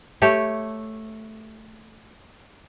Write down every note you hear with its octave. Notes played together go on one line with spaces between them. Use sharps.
A3 G4 C#5